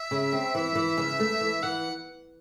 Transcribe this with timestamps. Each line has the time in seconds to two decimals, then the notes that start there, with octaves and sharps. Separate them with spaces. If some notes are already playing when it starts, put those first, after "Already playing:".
Already playing: E5
0.11 C#3
0.32 C4
0.55 E3
0.75 E3
0.97 C#3
1.20 A3
1.41 E3
1.63 E3 F#5